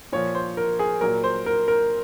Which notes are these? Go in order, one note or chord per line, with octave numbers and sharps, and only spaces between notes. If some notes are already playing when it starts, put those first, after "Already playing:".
A#2 F3 C#5
C5
A#4
G#4
A#2 F#3 A#4
C5
A#4
A#4